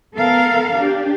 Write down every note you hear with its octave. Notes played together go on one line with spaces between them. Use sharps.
B3 A4 A#4 F5
D4 G4